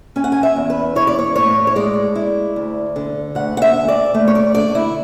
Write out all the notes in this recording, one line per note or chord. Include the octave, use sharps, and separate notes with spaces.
C#4 G#5
F#5
G#5
E5
E2
B4
E4 C#5
D5
C#5
A2 C#5
C#5
G#3 D5
E4
D2
D3
D2 F#5
F#5
E5
D2
D5
A3
C#5
D5
D3 D5
E4